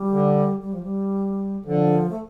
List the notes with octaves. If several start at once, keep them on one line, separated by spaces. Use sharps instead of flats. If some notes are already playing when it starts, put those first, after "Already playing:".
Already playing: G3
D3
G3
F3
G3
D3 F3
A3